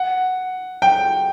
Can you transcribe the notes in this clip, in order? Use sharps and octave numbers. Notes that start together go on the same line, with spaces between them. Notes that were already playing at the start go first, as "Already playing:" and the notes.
Already playing: F#5
G5